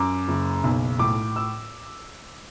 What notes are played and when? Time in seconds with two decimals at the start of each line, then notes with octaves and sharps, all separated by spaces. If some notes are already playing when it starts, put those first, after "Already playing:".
Already playing: F#2 D6
0.28 F#1
0.64 B1
0.99 A2 D6
1.36 E6